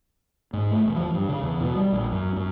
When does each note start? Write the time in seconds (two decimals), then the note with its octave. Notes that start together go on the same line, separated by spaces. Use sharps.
0.53 G#2
0.71 A3
0.85 E1
0.96 F3
1.14 G2
1.29 C#3
1.43 E2
1.60 B2
1.76 G3
1.93 A#1
2.12 F#2
2.36 F#2